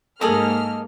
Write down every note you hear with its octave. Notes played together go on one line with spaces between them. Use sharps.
G#2 A#3 G#4 A4 D#5 F6